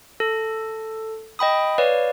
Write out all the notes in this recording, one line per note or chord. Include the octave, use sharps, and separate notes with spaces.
A4
D#5 G5 B5 D#6
B4 C#5 D5 F5